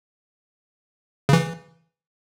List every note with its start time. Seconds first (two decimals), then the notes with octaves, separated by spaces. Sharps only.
1.29 C#3 E3